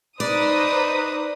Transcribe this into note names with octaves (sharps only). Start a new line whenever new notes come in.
D#4 B4 C5 D5 D#6